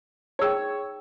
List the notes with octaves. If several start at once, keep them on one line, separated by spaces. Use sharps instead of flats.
D#4 G#4 C#5 G5 E6